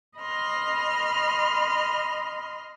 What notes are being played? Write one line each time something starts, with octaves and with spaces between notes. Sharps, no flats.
D#5 B5 C6 F6